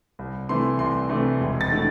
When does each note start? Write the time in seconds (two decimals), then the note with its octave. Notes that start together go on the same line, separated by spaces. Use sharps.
0.19 C2
0.49 C3 E3 A3 C6
0.79 C2 C6
1.09 C3 E3 A3
1.40 E1
1.61 A6
1.72 D3 A3 E4